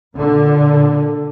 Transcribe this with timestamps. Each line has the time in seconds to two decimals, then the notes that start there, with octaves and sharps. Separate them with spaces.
0.15 A#2 D3